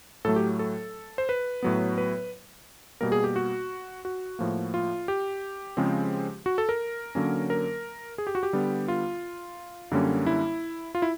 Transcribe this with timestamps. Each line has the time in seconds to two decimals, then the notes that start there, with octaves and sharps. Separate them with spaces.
0.25 A2 F#3 A3 A4
0.36 G4
0.59 A4
1.18 C5
1.29 B4
1.63 A2 F#3 B3
1.98 B4
3.01 B2 G3 A#3 A#4
3.12 G#4
3.24 G4
3.36 F#4
4.05 F#4
4.39 A2 F3 A#3
4.74 F4
5.08 G4
5.77 C#3 F3 G#3 C4
6.46 F#4
6.58 A4
6.69 A#4
7.15 D3 F#3 A#3 C#4
7.50 A#4
8.18 G#4
8.27 G4
8.35 F#4
8.43 G4
8.53 D3 G3 B3
8.88 F4
9.91 F#2 D3 G3 A#3 C#4
10.26 E4
10.95 F4
11.02 E4